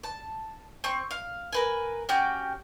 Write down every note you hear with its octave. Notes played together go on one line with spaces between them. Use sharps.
A5
C4 C#6
F5
A#4 B4 G#5
C#4 F#4 G4 G5